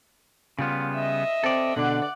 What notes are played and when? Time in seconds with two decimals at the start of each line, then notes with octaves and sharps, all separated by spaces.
0.59 C#3 G3 B3 F4
0.95 D#5 E5
1.44 C4 A4 D5
1.76 B2 D3 D4 D5 F#5